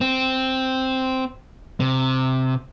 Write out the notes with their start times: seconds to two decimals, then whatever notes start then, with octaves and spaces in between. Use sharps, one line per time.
0.01 C4
1.80 C3